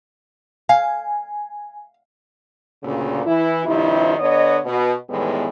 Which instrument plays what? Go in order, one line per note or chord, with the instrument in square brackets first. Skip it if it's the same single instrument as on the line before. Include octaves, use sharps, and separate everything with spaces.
[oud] F5 [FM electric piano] G#5
[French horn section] D2 A#2 C#3
E3 E4
G2 C3 D#3 F3 E4
D3 B3 C#5 D#5
B2
E2 A2 D#3 G3 G#3 B3